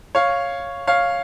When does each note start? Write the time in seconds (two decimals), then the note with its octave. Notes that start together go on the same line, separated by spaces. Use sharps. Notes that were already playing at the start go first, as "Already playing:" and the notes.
0.15 C#5 F5
0.87 C#5 F5